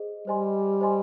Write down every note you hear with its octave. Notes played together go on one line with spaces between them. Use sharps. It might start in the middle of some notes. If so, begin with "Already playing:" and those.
Already playing: G#4 C5 D#5
G3 C5 D#5 G#5 C6
C5 D#5 G#5 C6